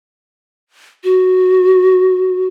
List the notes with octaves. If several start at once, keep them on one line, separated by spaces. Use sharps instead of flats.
F#4